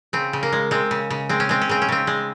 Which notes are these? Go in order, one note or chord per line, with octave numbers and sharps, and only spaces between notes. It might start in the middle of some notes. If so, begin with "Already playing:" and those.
C#3 C4
C#3
A#3
G#3
G#3 C4
C#3
C#3
G#3 C4
C#4
G#3 C4
C#4
C#3 C4
C#4
C#3 C4
G#3